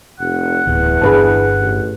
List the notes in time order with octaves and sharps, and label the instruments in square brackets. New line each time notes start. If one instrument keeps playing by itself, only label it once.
[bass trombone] F1 [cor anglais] F#5
[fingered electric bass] D1 [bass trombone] E2
[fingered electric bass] G1 D3 D4 [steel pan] G#4 B4 A5
[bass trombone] A1